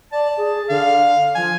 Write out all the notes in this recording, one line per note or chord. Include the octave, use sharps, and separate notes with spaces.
D5 A5
G#4
D3 F5
F3 G#5